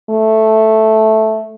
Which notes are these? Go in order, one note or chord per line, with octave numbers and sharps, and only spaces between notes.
A3